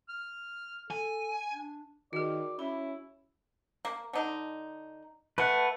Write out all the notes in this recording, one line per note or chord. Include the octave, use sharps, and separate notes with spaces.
F6
A4 G#5
D4
D#3 F#4 G#4 D5
C#4 E4 B5
A#3
D3 D#4
A3 B4 F#5